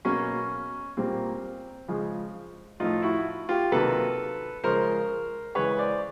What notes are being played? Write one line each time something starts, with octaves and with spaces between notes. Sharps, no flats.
B2 F#3 A#3 C#4
A#2 G3 A#3 C4
C#3 F3 G#3
A2 F3 A3 D#4 F4
E4 F#4
F4 G4
C3 D#3 F#3 A#3 A4 B4
C#3 F3 G#3 A#4 C5
C#3 E3 G#3 B4 C#5
C5 D5